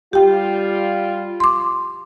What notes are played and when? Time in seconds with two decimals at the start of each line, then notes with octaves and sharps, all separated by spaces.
0.13 G3 F4 G4 G5
1.40 C6 D6